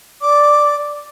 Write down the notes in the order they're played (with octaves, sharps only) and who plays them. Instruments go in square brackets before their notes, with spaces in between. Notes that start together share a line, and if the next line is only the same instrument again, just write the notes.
[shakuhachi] D5 [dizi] D6